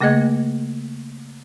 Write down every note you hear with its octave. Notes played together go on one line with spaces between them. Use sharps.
C#3 A3 A#3 G#4 D#5 G#6